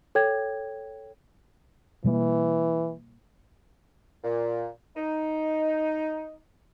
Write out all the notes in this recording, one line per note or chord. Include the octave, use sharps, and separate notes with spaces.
A4 C#5 G5 G#6
B2 E3 G3 A#3
A#2
D#4